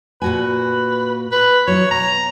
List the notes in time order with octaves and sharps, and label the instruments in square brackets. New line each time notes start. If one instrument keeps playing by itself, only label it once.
[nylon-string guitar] A#2 F#4 G#5 [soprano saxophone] B4
[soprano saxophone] B4
[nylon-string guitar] F#3 E4 [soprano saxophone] C#5
[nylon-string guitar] B2 [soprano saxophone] A#5